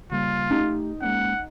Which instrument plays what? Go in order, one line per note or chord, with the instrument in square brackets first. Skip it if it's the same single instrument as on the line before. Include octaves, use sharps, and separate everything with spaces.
[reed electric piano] C#3 G3 A#3 [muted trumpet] F4
[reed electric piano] A3 G4 [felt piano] D#4
[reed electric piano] G#3 A#3 C#4 [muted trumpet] F#5